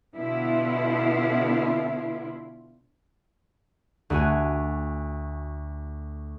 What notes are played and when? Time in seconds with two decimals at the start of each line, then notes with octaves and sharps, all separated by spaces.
0.15 B2 D3 B3 E4 F4
4.10 D2 F#4 G#5